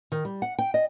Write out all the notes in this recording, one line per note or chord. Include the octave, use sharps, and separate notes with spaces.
D#3
G3
F#5
G5
D#5